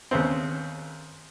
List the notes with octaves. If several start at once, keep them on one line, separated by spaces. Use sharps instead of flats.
D#2 C#3 B3 C4